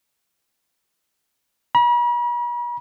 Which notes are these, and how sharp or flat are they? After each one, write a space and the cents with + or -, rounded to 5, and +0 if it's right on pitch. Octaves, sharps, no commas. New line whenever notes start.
B5 -45